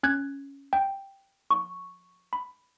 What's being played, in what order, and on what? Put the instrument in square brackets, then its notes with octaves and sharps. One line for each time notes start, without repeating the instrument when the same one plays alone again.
[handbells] C#4 F#6 G#6
G5
[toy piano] C#6
[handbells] B5